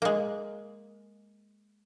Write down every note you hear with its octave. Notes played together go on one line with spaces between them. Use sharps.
G#3 A#3